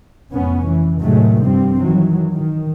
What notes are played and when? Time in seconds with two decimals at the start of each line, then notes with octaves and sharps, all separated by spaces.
0.34 F1 B3 C#4
0.67 E3
1.02 A2 C3 D#3 F#3 G#3 A3
1.45 G2 F3 G3 C4
1.81 D#3 E3 F#3
2.33 D#3